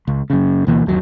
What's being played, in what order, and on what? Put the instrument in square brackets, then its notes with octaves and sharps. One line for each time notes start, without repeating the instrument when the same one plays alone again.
[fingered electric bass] C#2
F#2 C#3
D2 B2 E3 A#3
G1 D#2 F#3